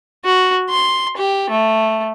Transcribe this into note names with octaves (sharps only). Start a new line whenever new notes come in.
F#4
C6
G4
A3